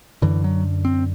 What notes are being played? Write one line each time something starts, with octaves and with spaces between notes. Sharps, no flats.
F#2 D3 E3
F#3
C4